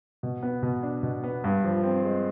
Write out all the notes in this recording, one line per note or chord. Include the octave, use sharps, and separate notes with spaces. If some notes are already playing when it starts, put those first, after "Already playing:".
B2
B3
B2
D4
B2
B3
G2
F3
C4
G#3